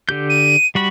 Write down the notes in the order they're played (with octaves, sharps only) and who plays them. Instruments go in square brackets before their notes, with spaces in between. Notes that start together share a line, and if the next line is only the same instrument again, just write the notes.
[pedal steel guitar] D3 G4 G6
[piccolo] D#7
[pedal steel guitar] G3 F#4 B5